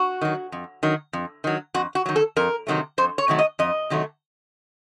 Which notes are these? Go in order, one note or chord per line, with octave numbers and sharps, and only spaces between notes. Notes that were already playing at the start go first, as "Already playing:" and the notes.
Already playing: F#4
D#3 F#3
F2
D#3 F#3
F2
D#3 F#3
F2 F#4
F#4
D#3 F#3
A4
F2 A#4
C3 D#3 F#3 A3
F2 C5
C#5
C3 D#3 F#3 A3
D#5
F2 D#5
C3 D#3 F#3 A3